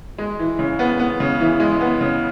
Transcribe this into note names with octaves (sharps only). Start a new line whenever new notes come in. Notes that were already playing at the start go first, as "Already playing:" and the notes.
G#3
E3
C#3
B3
B3
C#3
E3
G#3
B3
C#3